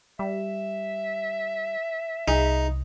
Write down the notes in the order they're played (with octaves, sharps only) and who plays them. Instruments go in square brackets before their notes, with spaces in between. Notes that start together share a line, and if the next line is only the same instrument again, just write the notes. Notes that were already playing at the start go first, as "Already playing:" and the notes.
[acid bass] G3 [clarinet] E5
[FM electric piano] C2 [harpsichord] D#4 [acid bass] G#4